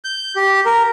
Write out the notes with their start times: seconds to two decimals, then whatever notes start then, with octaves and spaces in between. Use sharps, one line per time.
0.04 G6
0.36 G4
0.66 A#4